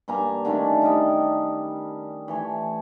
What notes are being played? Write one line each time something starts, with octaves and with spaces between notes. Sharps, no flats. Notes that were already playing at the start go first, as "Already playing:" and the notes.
G2 A#3 G#5 A#5
D3 D#3 A3 C#4
G3 A#4 D#5
E3 A3 C#5